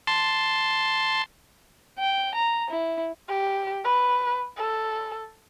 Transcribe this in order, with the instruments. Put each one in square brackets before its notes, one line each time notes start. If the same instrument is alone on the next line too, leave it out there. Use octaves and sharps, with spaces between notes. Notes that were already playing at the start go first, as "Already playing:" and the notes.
[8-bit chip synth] A5 C6
[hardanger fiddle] G5
A#5
E4
[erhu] G4
B4
A4